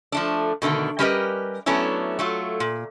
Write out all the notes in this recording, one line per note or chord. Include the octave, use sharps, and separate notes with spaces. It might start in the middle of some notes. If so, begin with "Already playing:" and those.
F3 A3 D4
B2 D3 D#3 A3
G3 C#4 G4 A#4 B4 D#5
F#3 A3 B3 C#4 D4 E4
F#3 A3 F4
A#2